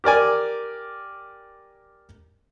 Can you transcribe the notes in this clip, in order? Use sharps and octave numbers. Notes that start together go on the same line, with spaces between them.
G4 A#4 D5 G#5